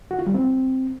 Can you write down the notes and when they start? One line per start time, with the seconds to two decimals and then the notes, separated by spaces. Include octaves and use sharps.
0.11 F#4
0.19 F4
0.27 G3
0.34 C4